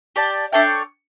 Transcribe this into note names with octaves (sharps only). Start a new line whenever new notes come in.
G4 D5 A5
D4 A4 C#5 E5 G5